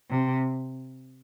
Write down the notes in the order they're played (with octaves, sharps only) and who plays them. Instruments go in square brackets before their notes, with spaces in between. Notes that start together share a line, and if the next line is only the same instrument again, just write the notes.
[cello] C3